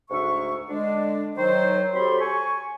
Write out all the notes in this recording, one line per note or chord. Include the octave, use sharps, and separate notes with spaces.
D2 G#2 E5 C#6
D3 G#3 D4
D#3 F#3 C5
F#3 C4 G4 A4 B5 C6
G#5 C#6